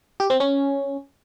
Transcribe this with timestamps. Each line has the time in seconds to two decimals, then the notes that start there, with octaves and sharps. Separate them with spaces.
0.20 G4
0.30 C4
0.40 C#4